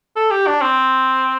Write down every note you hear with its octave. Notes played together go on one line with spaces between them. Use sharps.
A4
G4
D4
C4